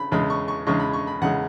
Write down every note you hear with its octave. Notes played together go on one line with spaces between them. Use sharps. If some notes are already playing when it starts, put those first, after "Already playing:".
Already playing: C#3 B5
E2 C#3 G#3 B5
C#6
C#6
E2 C#3 G#3 C#6
B5
C#6
B5
E2 C#3 G#3 F#5